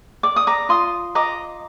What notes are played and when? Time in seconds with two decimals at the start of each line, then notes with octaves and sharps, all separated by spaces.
0.23 D5 D6
0.36 D#6
0.47 A#5 D6
0.69 F4 C6 D#6
1.15 D#5 A#5 D6